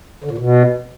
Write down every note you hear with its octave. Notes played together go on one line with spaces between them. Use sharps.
D3
A#2
B2